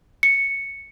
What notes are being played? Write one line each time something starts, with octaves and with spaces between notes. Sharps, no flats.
C#7